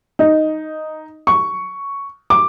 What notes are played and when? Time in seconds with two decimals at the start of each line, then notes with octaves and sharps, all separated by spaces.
0.19 D#4
1.27 C#6
2.30 D6